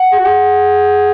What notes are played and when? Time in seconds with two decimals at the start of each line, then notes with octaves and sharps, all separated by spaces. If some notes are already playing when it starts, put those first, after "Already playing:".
Already playing: F#5
0.12 G#4
0.19 F#4
0.26 G#4